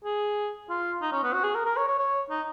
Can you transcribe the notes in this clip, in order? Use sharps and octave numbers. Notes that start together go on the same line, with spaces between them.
G#4
F4
D#4
C#4
B3
F#4
G#4
A#4
A#4
C#5
C#5
C#5
D#4